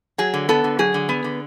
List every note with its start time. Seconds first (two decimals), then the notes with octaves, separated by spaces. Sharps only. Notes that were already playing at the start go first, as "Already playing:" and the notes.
0.18 F#3 G#4
0.34 D3
0.49 B3 A4
0.64 D3
0.79 F#3 G#4
0.94 D3
1.09 B3
1.24 D3